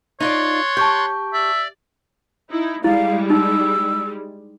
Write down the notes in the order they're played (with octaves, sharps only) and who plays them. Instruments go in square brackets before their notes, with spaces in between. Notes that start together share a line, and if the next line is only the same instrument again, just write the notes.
[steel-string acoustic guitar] D#4 F4 D5 [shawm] C#5 [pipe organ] C6 F#6 A6
[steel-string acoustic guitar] G4 [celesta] A5 C#6 G6
[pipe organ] D5 [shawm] E5
[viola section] D#4 E4
[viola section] G3 G#3 [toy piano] E4 [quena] F5
[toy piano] D#4 [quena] E6